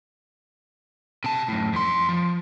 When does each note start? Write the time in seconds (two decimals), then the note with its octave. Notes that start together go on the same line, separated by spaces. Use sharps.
1.24 C3 A5
1.48 F#2 A2
1.73 F2 C6
2.09 F3